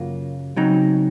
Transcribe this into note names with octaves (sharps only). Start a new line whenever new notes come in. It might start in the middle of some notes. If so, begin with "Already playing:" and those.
Already playing: F#2 C#3 F#3 A#3 F4
C#3 F#3 C4 D#4